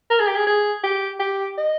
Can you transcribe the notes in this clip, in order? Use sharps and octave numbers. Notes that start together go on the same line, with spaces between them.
A#4
G#4
G4
G#4
G#4
G4
G4
D#5